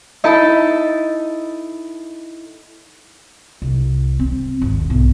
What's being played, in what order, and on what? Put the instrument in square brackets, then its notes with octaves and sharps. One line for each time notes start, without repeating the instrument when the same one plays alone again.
[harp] D#4 E4 A4 D#5 A5 B5
[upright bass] C2
C4
G#1 D#2
B1